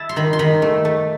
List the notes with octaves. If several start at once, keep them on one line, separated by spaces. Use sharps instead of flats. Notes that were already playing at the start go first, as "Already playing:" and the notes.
Already playing: E4 A5
C6
D#3 B5
C6
D#3 B5
A3
A3